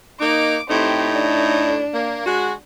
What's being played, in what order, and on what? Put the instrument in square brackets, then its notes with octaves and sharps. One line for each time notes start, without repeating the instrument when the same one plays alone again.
[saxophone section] A#3 D#4 [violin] D6
[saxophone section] A2 A3 D#4 [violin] C4 G4
[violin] D4
[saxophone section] A#3
G#3 F#4